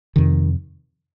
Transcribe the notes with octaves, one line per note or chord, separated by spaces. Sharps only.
F2 C3 D#3